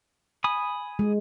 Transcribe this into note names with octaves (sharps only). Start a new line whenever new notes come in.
G#5 B5 D#6
G#3